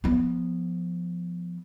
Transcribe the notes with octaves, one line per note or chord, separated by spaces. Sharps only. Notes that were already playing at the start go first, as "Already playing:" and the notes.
F3 B3